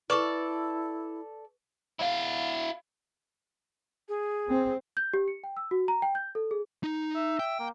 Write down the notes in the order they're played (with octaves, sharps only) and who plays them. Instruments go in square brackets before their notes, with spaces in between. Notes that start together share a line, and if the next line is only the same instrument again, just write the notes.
[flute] E4 [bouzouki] A4 D5 [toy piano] B4 C#6
[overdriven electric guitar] E4 F5
[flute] G#4
[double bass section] C4
[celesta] G6
G4
C#7
G5
E6
F#4
A#5
G5
G6
A4
G#4
[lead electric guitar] D#4
[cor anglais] E5
[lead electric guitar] G5
[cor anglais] A#3